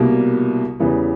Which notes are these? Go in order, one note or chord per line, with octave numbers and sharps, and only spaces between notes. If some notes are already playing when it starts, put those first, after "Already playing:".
Already playing: C2 B2 G3 A#3
E2 C#3 E3 G3 B3